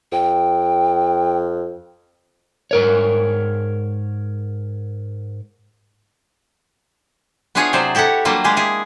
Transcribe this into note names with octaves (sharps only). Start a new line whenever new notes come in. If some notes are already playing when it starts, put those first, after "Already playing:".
F2 G5
G#2 A#4 C#5
B3 D4 E4 F4 G#4 C#5
C3 F#3 C5 D5
E4 G4 A4 C#5 F#5
F#3 G3 A#3 D4 F4
G#3 G4 G#4
E4 G#4